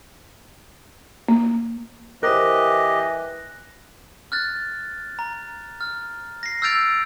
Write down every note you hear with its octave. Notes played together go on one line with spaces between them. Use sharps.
A#3
E3 G4 A#4 C5 D#5 F#6 A#6
F6 F#6 A6
A#5
F6
A#6 C7
E6 F6 G6 A6 D7 F7